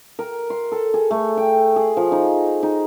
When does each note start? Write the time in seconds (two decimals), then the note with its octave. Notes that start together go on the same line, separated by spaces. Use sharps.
0.19 A#4
0.50 C6
0.72 A4
0.94 G#4
1.11 A3
1.37 G5
1.76 G#4
1.97 F3
2.12 D#4
2.63 D#4